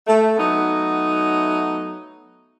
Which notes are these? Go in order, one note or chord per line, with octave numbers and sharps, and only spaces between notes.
A3
F#3 A3 B3 D#4